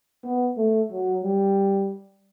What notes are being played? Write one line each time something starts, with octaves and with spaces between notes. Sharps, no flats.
B3
A3
F#3
G3